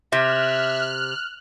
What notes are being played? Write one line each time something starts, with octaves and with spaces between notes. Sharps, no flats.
C3 E5 F6 F#6